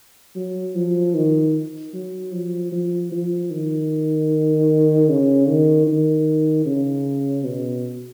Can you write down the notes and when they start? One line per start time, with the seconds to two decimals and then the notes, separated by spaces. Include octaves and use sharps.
0.36 F#3
0.75 F3
1.14 D#3
1.93 F#3
2.32 F3
2.72 F3
3.12 F3
3.50 D#3
5.09 C#3
5.48 D#3
5.87 D#3
6.66 C#3
7.44 B2